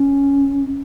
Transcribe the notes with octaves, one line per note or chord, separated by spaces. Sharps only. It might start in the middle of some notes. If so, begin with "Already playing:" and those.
Already playing: C#4